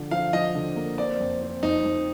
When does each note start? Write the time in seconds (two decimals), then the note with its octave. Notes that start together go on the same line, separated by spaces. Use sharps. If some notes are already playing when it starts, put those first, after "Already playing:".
Already playing: D3 F3
0.11 F3 F5
0.33 F3 D#5
0.55 D3
0.76 A#3
0.98 C4 D5
1.19 F2
1.41 C4
1.63 F2 D#4
1.84 F2